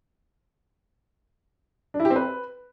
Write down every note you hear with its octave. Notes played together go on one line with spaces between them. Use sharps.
D4
E4
G4
C4
B4